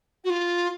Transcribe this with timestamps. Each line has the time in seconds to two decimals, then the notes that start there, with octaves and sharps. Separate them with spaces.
0.24 F#4
0.30 F4